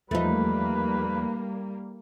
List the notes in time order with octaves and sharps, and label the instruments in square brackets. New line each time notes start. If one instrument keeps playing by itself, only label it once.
[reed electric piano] E2 F3 [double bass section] G3 A#3 [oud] A3 D#4 [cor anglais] B4